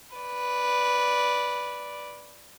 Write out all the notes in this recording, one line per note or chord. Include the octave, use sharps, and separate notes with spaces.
B4 D5